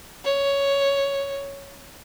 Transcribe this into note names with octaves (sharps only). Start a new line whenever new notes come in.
C#5